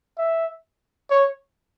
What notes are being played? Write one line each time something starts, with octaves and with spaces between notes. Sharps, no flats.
E5
C#5